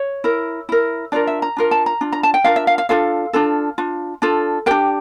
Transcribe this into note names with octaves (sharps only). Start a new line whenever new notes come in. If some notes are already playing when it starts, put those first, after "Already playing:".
Already playing: C#5
E4 A#4
E4 A#4
D4 F4 A#4 D5
E5
A#5
D4 F4 A#4
A5
A#5
D4 F4
A#5
A5
G5
D4 F4 A#4 F5
E5
F5
F5
D4 F4 A4 F5
D4 F4 A4
D4 F4
D4 F4 A4
D4 G4 A#4 G5